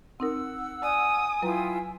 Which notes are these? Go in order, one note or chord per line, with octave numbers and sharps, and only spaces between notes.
C4 D#4 A#4 F#5 E6
D5 G#5 D#6
F#3 E4 F4 B4 G5 A#5